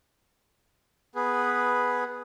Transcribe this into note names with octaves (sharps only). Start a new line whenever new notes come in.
B3 G#4 B4